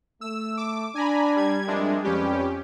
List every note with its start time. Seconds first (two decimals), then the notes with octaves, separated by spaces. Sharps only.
0.21 A3 E6
0.57 D6
0.95 D4 G#5 A#5 B5
1.36 G3 G#6
1.67 F2 G3 G#3 D4 A#4 E5
2.04 F2 C#4 G4 B4 D5